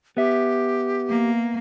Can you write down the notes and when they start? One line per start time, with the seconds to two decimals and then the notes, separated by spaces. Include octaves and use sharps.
0.17 B3 G4 E5
1.09 A#3